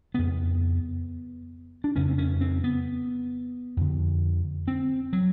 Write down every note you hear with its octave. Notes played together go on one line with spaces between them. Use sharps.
F2 C#3 B3
D4
F2 C#3 C#4
C4
C#4
C4
B3
F2 D3
C4
F#3